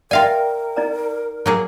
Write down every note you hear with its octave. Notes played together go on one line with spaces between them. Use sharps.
F4 A#4 D5 E5 F5 G5 G#5
D#4 D5 A#5
F#3 A#3 G#4